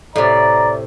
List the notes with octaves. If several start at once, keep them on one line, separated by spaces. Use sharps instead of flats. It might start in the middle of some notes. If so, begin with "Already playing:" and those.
A2 C3 D5 A#5